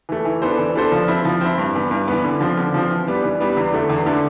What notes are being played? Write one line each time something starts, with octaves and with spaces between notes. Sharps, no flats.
E3 A3
E3
B3 D4 A4 C5
E3
B3 D4 A4 C5
F3
C4 E4
F3
C4 E4
G2
E3 B3
G2
E3 B3
D3
F3 C4
D3
F3 C4
E3
G3 B3 D4
E3
G3 B3 D4
E2
D3 A3 D4
E2
D3 A3 D4